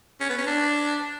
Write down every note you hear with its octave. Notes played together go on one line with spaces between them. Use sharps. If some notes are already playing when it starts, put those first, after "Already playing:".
C#4
B3
C#4
D4